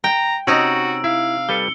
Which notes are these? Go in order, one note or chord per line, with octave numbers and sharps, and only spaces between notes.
G5 A#5
C3 C#4 D#4 F#4 D#5 E6 D7
E4 F5
G3 A4 B4 C#7 G7